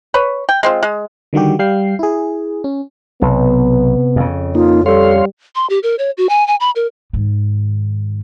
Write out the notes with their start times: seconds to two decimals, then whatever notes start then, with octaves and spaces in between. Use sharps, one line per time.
0.14 B4 C#5
0.49 G5
0.63 G#3 C4 F4
0.83 G#3
1.33 D3 D#3 G3 F#4 G4
1.59 G3 F5 G5 C7
1.99 E4 G#4
2.64 C#4
3.22 B1 C3 B3
4.16 F2 C#3
4.55 A#3 D#4 F4
4.86 G3 A4 C#5 F5 C6
5.55 C6
5.70 G4
5.83 A#4
5.99 C#5
6.18 F#4
6.29 G#5
6.48 G#5
6.60 B5
6.76 A#4
7.13 G#2 D#3